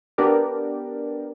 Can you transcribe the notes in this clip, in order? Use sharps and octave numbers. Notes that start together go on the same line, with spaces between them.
B3 D4 G4 A#4 D5